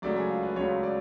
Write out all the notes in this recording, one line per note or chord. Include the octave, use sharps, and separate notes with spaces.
C#2 C#3 F#3 A3 D5
G#4
F4
B4
C#2 C#3 F#3 A3 C#5
D5